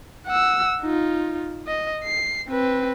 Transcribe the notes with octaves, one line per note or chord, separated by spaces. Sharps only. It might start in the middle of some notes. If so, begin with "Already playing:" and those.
F#5 E6
D#4 F4
D#5
C7
C4 B4